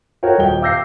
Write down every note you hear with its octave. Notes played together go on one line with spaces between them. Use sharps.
F#4 A4 A#4 C#5 G5
D#1 D#5 G5 G7
F5 D6 E6 G6 A#6 C7